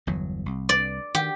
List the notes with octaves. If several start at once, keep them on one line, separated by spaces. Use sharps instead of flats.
G1 E2 F#3
C2
D5
D#3 G4